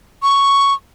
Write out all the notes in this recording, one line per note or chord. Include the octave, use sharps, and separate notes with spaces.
C#6